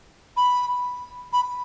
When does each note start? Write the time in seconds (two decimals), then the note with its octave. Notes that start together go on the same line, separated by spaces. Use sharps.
0.37 B5
1.33 B5